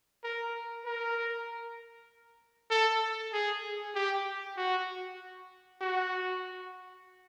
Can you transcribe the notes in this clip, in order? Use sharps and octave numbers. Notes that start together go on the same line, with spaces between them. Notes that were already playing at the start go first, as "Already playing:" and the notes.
A#4
A#4
A4
G#4
G4
F#4
F#4